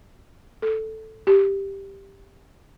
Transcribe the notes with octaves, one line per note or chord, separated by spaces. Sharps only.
A4
G4